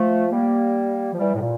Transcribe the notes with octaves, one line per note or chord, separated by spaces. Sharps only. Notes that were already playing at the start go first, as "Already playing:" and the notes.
Already playing: F3 A3
G3 A#3
F3
E3 G3
A2
A#2